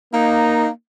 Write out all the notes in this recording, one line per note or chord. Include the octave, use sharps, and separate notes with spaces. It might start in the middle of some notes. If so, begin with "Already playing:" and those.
A#3 D#4